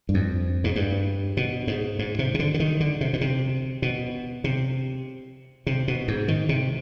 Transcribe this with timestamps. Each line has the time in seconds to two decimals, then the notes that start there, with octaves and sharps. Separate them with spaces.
0.09 G2
0.14 F2
0.64 G#2
0.76 G2
1.37 B2
1.67 G#2
1.99 G#2
2.19 C3
2.34 C3
2.39 D3
2.54 D3
2.60 D#3
2.80 D3
3.01 C3
3.13 B2
3.21 C3
3.82 B2
4.44 C3
5.67 C3
5.88 B2
6.08 G#2
6.28 D#3
6.49 C3